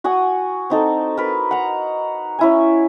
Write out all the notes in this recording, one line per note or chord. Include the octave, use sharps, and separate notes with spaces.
F#4 F#5 G#5 D#6
C4 D#4 A4
A#4 B4
F#5 A#5
C#4 E4 G#5